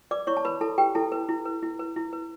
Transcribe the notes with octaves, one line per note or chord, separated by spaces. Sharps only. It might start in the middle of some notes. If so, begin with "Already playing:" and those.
B4 D5 D6
E4 C#5 C#6
A5
B4 B5
E4 A4 A5
G4 B4 G5
E4 A4 A5
B4
E4
B4
E4
B4
E4
B4